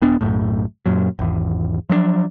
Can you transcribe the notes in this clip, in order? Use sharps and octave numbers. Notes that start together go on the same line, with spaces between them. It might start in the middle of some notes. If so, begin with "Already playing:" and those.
D#1 B3 D4
B1 F#2 A2
F#2 A#2 F#3
G#1 E2
F3 F#3 A3 D4